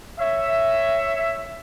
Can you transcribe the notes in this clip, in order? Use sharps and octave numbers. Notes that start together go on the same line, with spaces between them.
C#5 E5